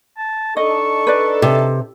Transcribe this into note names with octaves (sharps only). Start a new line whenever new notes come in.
A5
D4 D#4 A4 D#5 C#6
B4 D5
C3